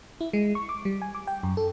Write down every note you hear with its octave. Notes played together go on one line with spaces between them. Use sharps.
E4
G#3
C#6
D6
G3
G#5
D6
G5
F#2
A4